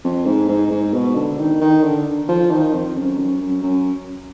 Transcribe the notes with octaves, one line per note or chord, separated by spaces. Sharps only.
F2
G#2
G#2
G#2
B2
D3
D#3
D#3
D3
F3
D#3
F2
F#2
F#2
F#2
F#2